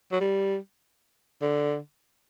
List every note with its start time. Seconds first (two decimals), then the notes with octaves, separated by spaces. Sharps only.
0.12 F#3
0.20 G3
1.42 D3